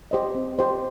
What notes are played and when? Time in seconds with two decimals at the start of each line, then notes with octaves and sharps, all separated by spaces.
0.11 G4 C5 D#5
0.35 C4
0.58 G4 C5 D#5